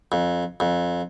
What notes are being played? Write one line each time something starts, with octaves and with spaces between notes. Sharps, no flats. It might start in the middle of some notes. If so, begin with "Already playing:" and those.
F2
F2